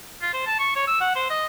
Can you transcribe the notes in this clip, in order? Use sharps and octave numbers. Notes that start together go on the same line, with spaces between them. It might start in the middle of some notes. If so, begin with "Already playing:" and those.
F4
C5
A5
C#6
C#5
E6
F#5
C5
D#5